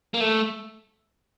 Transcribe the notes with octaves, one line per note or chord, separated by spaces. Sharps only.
A#3
A3